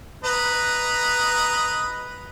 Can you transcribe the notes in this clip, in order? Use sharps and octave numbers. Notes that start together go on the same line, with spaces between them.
B4 D#5 A#5